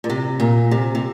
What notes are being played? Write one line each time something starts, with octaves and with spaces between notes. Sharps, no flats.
A#2
C3
A#2
C3
C3